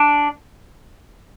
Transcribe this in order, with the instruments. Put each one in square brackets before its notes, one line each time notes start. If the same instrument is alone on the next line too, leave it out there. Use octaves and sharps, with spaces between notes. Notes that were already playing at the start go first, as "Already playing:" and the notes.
Already playing: [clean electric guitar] D4